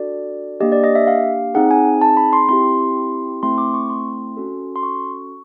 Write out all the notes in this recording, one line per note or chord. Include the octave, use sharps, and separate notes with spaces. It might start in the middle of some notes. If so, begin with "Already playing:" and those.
Already playing: D4 F#4 A4 D5
A#3 D4 G4 D#5
D5
D#5
E5
F5
C4 D#4 G#4 F#5
G#5
A5
B5
C6
C4 E4 G4 C6
A3 C4 E4 C6
D6
C#6
C6
C#4 F#4 A4
C6
C#6